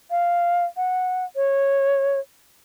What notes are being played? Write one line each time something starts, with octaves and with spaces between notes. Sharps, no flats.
F5
F#5
C#5